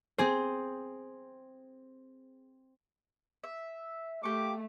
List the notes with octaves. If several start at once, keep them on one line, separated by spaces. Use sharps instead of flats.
C4 G#4 C5
E5
A3 A#3 G4 C#6 D6